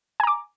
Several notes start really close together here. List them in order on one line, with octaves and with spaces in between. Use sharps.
G#5 A#5 D6